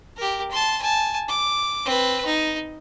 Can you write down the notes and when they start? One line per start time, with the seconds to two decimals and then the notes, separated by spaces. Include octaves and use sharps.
0.17 G4 A#4
0.51 A5 C6
0.82 G#5 A5
1.28 D6
1.86 C4 B4
2.25 D#4